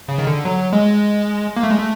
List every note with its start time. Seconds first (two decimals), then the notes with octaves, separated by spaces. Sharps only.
0.08 C#3
0.18 D#3
0.27 D3
0.45 F#3
0.73 G#3
1.57 A#3
1.63 A3
1.71 G#3
1.78 A3